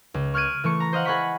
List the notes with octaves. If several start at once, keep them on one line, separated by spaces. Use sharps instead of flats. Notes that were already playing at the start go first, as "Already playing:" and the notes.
C#2
C#6 F6 F#6 G#6 D7 D#7
E3 A3 C#6 C#7
A#5
C5 D#5 F5 F#5
G#4 F#5 B5 C#6 B6 C#7